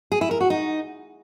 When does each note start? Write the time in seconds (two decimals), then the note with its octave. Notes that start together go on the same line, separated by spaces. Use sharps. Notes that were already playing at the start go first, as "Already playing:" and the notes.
0.12 G#4
0.21 E4
0.31 A#4
0.41 F#4
0.50 D#4